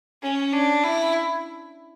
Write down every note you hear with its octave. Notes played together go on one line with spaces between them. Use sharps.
C#4
D4
E4